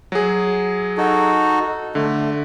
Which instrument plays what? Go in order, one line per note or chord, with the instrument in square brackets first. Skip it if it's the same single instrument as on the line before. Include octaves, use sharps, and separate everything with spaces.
[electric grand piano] F#3 G#4
[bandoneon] D#4 F#4 A4
[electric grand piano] D3 [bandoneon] A3